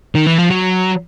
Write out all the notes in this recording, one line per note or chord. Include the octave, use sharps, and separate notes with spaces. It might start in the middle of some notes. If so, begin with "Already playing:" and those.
D#3
E3
F3
F#3